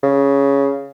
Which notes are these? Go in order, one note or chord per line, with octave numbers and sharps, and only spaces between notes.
C#3